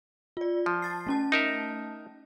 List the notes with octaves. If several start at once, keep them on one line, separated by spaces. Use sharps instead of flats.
F4 D5
F3
A5 A6 C7
A3 C#4 A5
D#4 A#4 E5